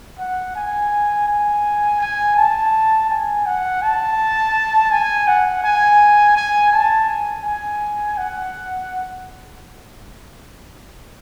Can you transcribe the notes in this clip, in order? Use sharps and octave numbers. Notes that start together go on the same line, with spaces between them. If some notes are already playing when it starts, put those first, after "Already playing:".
F#5
G#5
G#5
G#5
A5
G#5
F#5
A5
G#5
F#5
G#5
G#5
A5
G#5
G#5
F#5